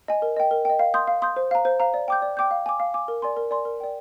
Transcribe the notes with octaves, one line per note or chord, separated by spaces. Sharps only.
D#5 G#5
A#4
D#5 G5
A#4
D#5 G5
F5
C6 D#6 G6
F5
C6 D#6 G6
C5
F5 A#5
C5
F5 A#5
D5
G5 D6 G6
D5
G5 D6 G6
F5
G#5 D6
F5
G#5 D6
A#4
D5 G#5 C6
A#4
D5 G#5 C6
A#4
D5 G5